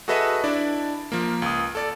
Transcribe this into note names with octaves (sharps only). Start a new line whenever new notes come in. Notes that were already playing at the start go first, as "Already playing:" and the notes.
F#4 G#4 A4 B4 D#5 E5
D4 E4 D5
F3 A#3
C#2 D#6
A4 D5 A6